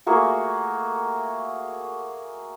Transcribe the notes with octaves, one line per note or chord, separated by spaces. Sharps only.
A3 A#3 F#4 G#4